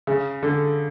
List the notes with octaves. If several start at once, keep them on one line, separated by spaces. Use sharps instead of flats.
C#3
D3